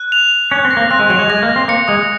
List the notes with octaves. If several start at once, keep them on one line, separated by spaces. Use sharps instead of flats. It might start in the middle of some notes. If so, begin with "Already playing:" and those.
Already playing: F#6
F7
F7
C#4 F#6
C4
A#6
A#3
C4 F#6
G#3
F#3 F7
G#3
G#3 A#6
A#3
A#6
C4
A#3 C#7
G#3 D#6